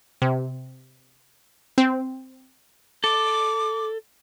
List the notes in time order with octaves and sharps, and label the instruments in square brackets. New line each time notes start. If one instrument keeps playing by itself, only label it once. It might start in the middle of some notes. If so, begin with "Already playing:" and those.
[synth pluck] C3
C4
[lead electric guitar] A4 [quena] D6